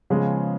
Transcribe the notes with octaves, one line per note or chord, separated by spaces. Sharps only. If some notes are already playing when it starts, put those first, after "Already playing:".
C#3 F3 G#3 B3